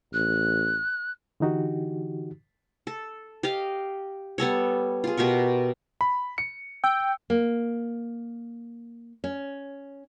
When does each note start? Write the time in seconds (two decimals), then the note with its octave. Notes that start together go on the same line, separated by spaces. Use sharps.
0.13 A1 F#6
1.40 D3 E3 D#4 F#4 G4
2.87 A4
3.43 G4 D#5 F5
4.38 G3 B3 A4 C#5
5.04 F4 G#4
5.17 B2 G4 A#4 C#6
6.01 B5
6.38 C#7
6.84 G5 E6
7.30 A#3
9.24 C#4